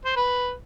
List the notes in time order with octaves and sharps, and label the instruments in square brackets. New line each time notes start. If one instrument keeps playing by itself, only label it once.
[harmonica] C5
B4